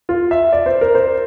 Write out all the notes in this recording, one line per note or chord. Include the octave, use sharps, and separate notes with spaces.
F4
E5
D5
C5
A#4
C5